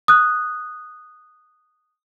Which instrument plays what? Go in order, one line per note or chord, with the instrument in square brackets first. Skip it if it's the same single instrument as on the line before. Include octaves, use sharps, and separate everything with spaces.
[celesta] D#6 F#6